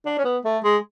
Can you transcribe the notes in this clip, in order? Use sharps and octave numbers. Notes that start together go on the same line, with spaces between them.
D4
C#4
B3
A3
G#3